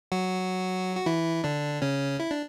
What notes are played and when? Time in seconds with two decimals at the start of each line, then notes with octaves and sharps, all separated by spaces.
0.12 F#3 F#4
0.96 F#4
1.06 E3 E4
1.44 D3 D4
1.82 C#3 C#4
2.20 E4
2.31 D4